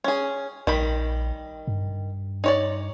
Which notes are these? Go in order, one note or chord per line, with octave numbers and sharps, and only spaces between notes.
C#4 G#4
A#1 D#3 G3 B5
G2
D#4 C#5 D5